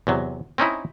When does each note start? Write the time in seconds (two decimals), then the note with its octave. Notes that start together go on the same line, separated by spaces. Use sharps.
0.07 E2 C3 F#3
0.58 C4 C#4 D#4 E4